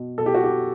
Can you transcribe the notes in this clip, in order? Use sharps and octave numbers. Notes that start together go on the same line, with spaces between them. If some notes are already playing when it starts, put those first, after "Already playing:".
Already playing: B2
B2 A4
G4
F#4
G4